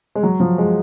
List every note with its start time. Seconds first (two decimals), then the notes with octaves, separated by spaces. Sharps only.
0.15 G#3
0.23 F#3
0.40 F3
0.58 G#3